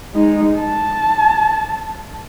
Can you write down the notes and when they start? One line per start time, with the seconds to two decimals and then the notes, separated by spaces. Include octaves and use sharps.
0.15 G#3 D#4
0.59 A5